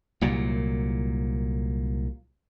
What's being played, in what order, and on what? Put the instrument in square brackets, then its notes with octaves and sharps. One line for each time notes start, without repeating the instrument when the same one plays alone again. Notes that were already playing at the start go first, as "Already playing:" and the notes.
[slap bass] C2 A#2 F#3